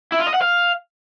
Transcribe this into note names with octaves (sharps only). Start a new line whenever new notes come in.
E4
F4
D#5
F#5
F5